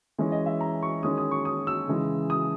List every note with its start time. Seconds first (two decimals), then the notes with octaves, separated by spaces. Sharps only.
0.18 E3 G#3 C#4
0.32 D#5
0.46 E5
0.61 A#5
0.83 C#6
1.03 D#3 G#3 C#4 D#6
1.18 D#6
1.31 C#6
1.45 D#6
1.67 E6
1.88 C#3 E3 G#3
2.30 D#6